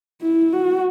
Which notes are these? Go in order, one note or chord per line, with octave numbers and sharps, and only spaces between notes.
E4
F#4